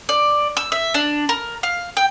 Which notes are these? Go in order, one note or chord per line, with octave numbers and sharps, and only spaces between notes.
D5
E6
E5
D4
A#4
F5
G5